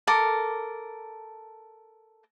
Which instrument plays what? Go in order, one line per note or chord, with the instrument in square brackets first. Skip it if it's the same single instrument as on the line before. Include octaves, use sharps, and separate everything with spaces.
[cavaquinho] A4 A#4 D6